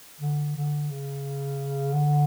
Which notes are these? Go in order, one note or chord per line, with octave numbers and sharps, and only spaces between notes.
D3
D3
C#3
D3